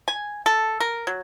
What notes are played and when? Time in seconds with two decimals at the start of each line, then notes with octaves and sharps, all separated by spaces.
0.08 G#5
0.46 A4
0.80 A#4
1.07 F#3